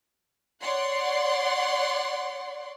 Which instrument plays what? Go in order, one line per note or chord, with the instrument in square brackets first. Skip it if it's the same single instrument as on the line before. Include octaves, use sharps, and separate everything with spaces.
[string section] C#5 D5 F#5 C6